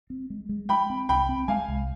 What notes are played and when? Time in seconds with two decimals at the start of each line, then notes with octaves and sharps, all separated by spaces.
0.10 C4
0.30 G#3
0.49 G#3
0.69 G#3 G5 B5
0.90 C4
1.09 C2 G5 B5
1.29 C4
1.48 G#3 F5 G#5
1.68 C2